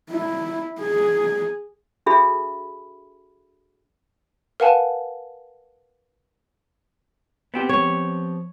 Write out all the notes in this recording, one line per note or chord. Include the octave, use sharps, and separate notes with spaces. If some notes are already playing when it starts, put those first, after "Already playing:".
E4
G#4
D4 F#4 G#4 A4 E5 B5
A#4 B4 F5 F#5 G#5 A5
B3 C4 G4
F3 C#5